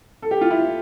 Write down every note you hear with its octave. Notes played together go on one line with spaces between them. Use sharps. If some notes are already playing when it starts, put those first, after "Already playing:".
A4
G4
F4
E4